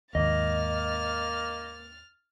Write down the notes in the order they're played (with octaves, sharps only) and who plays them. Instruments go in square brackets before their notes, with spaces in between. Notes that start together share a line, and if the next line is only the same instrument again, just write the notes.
[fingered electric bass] D#2 G#2 [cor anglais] A#3 [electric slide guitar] D#5 [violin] F6 A6